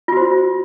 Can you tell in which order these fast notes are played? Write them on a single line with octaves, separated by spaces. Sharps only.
F4 F#4 C5